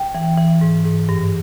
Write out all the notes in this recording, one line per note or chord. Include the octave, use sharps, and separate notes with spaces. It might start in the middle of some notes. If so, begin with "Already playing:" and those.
Already playing: G5
E3
E3
G#2
G#2
G2